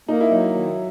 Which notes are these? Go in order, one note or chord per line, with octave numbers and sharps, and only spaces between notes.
A#3 D#4
E4
F#3 D#4
D#3